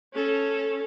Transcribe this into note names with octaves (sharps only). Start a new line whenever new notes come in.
C#4 A4